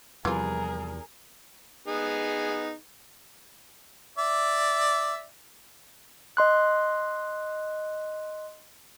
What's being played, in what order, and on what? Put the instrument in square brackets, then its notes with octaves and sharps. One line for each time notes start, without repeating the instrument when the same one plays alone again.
[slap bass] E2 [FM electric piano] C3 F3 G3 [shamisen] E3 F4 [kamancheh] G#4 A#4
[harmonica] B3 D#4 G#4
D5 E5
[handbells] D#5 C6 F#6